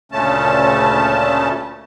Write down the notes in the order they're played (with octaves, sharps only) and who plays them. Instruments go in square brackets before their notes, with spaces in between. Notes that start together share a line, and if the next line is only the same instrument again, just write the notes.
[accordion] D2 A#2 C#3 A3 C#4 A5